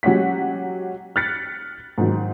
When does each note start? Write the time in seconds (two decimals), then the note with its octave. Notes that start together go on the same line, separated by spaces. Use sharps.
0.03 F#3 G#3 C#4 G4 F#5 B6
1.16 F6 F#6 A6 B6 C#7
1.98 G#2 D#3 F#3